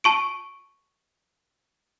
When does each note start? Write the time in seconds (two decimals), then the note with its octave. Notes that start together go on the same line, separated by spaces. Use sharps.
0.04 A5 C#6 D7